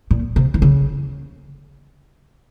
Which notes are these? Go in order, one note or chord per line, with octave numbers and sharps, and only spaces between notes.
A#2
C3
D#3
C#3